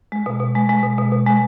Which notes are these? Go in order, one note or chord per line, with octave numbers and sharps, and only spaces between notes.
G#3
B2
B2
G#3
G#3
B2
B2
B2
G#3